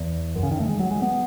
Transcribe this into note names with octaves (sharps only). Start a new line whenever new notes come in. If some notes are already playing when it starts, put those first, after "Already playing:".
Already playing: E2
F#2
C#3
D#3
A3
G#3
F#3
G#3
B3